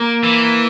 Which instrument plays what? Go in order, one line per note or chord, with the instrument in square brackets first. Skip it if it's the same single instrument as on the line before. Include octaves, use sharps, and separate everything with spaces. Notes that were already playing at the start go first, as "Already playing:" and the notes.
Already playing: [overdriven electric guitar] A#3
[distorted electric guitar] E3